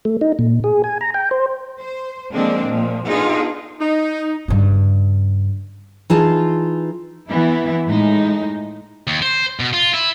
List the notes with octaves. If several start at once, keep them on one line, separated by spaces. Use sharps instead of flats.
A3
D#4
A#2
G#4
G#5
A#5
G5
C5
C5
D3 F3 G#3 A#3 C4 D4
A#2 F3
B3 D4 D#4 F4 G#4 A4
D#4
G2 C#3
E3 D#4 F4 G#4 A5
E3 B3 E4
A2 G#3 D#4
D#2
C5
B2
F4
E4